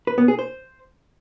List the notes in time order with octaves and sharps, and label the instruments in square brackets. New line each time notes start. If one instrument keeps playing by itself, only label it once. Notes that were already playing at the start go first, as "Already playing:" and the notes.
[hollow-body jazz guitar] B4
B3
G#4
C5